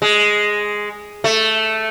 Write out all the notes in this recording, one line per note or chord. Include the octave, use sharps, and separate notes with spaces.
G#3
A3